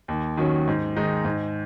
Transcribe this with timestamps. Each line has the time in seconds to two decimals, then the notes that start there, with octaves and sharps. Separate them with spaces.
0.08 D#2
0.37 D#3 F#3 C#4
0.67 G#2
0.96 D#3 G#3 D#4
1.25 G#2